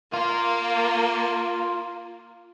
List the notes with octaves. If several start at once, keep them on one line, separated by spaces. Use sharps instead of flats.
A#3 F4